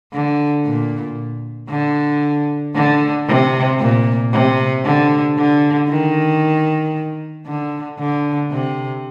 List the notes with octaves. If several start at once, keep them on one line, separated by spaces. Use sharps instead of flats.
D3
A#2
D3
D3
C3
A#2
C3
D3
D3
D#3
D3
D3
C3